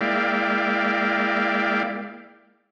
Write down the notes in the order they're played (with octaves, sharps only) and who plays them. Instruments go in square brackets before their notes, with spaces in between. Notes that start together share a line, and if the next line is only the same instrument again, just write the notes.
[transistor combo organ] G#3 A#3 E4 D5 F5 G5